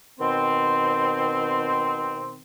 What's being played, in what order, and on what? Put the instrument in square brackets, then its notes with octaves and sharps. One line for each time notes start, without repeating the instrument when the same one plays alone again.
[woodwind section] B2 D#3 C4